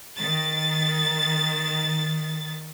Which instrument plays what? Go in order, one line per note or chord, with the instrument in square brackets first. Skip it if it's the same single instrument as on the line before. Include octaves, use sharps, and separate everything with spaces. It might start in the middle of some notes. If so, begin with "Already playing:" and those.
[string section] D#3 A6